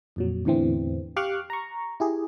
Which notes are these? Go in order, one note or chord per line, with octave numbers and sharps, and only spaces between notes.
F2 A#2 F#3
E2 A2 D3 E3 C4
G4 F5 C#6 D6 F6 F#6
A#5 C#6
E4 G4 G#4